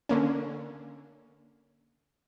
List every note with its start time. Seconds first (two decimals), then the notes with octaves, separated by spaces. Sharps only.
0.09 D3 A#3 C#4